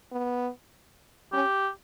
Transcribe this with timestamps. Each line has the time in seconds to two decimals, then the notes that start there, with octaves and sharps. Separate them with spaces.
0.12 B3
1.33 C#4 G4